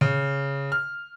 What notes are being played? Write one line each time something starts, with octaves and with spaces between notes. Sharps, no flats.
C#3
F6